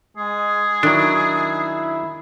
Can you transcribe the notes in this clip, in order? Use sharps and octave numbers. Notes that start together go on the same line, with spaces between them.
G#3 G#4
D#3 F#3 D4 E4